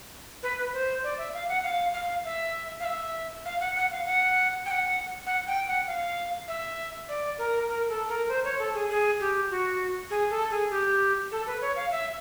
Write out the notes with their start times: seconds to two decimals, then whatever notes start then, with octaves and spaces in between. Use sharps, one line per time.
0.43 B4
0.73 C5
1.04 D5
1.18 E5
1.34 F5
1.49 F#5
1.64 F5
1.94 F5
2.25 E5
2.80 F5
2.85 E5
3.45 F5
3.60 F#5
3.75 F#5
3.91 F5
4.06 F#5
4.66 G5
4.71 F#5
5.26 F#5
5.47 G5
5.67 F#5
5.87 F5
6.48 E5
7.09 D5
7.38 A#4
7.68 A#4
7.89 A4
8.09 A#4
8.29 C5
8.44 C#5
8.59 A4
8.74 G#4
8.90 G#4
9.20 G4
9.50 F#4
10.10 G#4
10.30 A4
10.51 G#4
10.70 G4
11.31 A4
11.47 B4
11.61 C#5
11.76 F5
11.91 E5